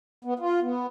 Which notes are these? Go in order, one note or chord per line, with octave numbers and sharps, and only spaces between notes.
B3
F4
B3